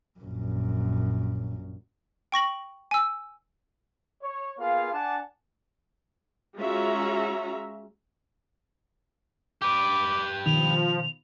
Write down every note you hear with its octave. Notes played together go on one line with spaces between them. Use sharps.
A#1 F#2
G5 C#6 A#6 F#7
G#5 E6
C#5
A#3 B3 F4 G#4 F5
D4 F#5 G#5 A5
G#3 C#4 F4 F#4 E5 A#5
G4 B4 D6
B2 D#3 F3 F7